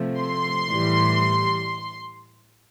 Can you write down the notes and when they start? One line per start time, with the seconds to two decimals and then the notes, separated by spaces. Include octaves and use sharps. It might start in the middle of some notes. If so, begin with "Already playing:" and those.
Already playing: C3 F3 A3
0.20 C6
0.68 A2 E3 G3